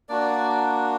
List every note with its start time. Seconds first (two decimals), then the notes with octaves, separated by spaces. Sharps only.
0.09 A#3 D4 F#4 D5